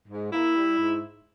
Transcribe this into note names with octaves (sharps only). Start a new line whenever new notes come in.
G#2
A#3 E4
G3
G#2